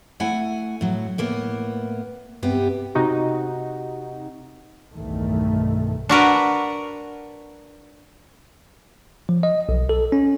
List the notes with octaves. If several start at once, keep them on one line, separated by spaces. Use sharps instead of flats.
A3 E4 F#5 G#5
A2 F#3
A2 A#3 B3
G2 C3 B3 G4
C3 D#4 F#4
B1 E2 G2 D#3 A3
D4 F#4 A#4 B4
F3
D#5
B1
A4
C#4